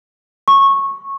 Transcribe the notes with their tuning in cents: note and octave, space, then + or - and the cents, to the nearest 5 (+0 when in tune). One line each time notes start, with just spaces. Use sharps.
C#6 -15